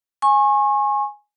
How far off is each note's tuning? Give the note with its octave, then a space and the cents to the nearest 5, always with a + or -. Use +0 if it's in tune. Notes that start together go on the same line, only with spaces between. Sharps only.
G#5 +0 C#6 -35